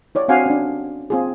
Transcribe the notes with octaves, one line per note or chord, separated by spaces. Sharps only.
E4 C#5 D5
C4 D4 F#4 F5 F#5 G#5
C#4 D4
C4 F4 G#4